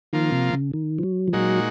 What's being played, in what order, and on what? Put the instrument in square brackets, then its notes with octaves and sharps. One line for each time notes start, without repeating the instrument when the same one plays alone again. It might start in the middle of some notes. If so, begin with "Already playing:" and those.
[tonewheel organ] D#3 [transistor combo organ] F3 A#3 F4
[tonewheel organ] C3
C#3
D#3
F3
F#3
F3
[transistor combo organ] A#2 G#3 D#4 F#4 [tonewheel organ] F#3